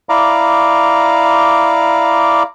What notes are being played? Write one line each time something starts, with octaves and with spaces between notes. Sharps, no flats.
E4 D5 F5 A#5 D6